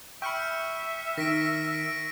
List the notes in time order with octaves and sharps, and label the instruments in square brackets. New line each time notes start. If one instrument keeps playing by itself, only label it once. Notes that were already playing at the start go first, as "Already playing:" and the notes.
[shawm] E5 [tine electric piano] G5 B5 [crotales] C#6 F6 C#7
[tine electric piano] D#3 [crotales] A#6 B6 D7
[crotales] D7